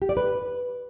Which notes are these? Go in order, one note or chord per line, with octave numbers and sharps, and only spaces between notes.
G4
D5
B4